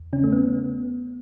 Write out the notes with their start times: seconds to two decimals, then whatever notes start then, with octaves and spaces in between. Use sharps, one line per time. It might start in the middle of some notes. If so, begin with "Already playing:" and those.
Already playing: E2
0.13 C#3 C#4
0.24 A3
0.32 B3